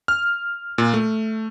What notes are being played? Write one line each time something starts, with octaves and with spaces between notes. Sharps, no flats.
F6
A#2
A3